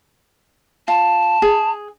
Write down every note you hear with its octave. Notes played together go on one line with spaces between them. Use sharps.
F4 A5
G#4